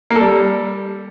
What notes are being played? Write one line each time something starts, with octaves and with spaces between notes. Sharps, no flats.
A#3
A4
G3